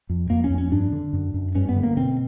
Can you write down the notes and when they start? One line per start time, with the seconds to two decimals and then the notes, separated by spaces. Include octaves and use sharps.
0.09 F2
0.30 F2 A#3
0.44 C#4
0.50 F2
0.58 C#4
0.71 G2 D4
0.92 D3
1.13 F#2
1.34 F#2
1.55 G2 C#4
1.69 B3
1.76 D3
1.83 A#3
1.97 B2 C4